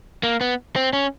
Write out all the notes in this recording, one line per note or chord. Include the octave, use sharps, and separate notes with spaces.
A#3
B3
C4
C#4